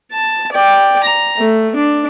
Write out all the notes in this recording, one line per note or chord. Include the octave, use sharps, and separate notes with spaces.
A5
D5 G5
A#5
A3
D4